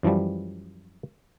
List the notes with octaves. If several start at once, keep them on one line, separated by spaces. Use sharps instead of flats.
F#2 E3 F3 G3